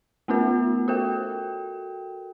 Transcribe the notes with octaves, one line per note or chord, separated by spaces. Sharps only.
A3 B3 C#4 F4 A#4
F#4 A4 A#4 G5